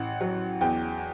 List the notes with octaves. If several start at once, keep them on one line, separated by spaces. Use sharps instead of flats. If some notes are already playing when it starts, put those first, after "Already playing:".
Already playing: A1 F#5
F#3
E2 G5